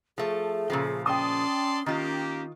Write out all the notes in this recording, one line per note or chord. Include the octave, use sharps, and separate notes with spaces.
F3 A3 G#4
A#2 C#3 F3
C#4 D5 G5 A5 C6 D#6
D#3 A#3 C#4 F4 G4